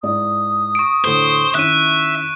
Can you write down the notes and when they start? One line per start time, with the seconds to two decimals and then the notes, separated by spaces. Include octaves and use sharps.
0.03 G#2 E4 D5 D#6
0.75 C#6 D7
1.05 D2 A2 A4 C5
1.55 D#3 C#4 E4 E5 F#6 D#7